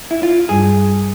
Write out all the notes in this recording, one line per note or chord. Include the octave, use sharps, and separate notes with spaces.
E4
F4
G2 G#4